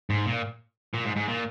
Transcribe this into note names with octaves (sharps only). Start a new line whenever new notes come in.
G#2
A#2
A#2
G#2
G#2
A#2